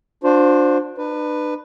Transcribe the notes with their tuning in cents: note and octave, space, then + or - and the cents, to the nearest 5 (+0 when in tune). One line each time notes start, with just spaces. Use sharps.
D4 +0 F4 +45 C5 -5
D4 +40 B4 +5